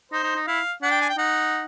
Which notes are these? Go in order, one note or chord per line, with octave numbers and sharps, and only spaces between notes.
D#4 C5
D#4
D#4
E4 F5
D4 F#5
G5
G#5
G5
D#4 F#5